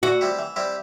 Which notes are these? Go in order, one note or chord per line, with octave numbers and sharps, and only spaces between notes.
E3 F#4
G3 C4 E4 G4
E3
G3 C4 E4 G4